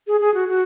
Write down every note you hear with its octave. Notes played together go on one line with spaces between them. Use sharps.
G#4
G#4
F#4
F#4